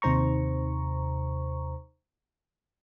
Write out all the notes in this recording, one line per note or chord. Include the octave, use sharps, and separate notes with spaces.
D#2 C3 D#4 C5 A#5 C#6